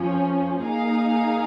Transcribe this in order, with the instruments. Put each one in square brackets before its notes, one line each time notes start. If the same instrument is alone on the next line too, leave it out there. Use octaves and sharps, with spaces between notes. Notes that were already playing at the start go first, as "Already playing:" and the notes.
Already playing: [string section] F2 F3 C#4
A#3 D#4 G#4 F5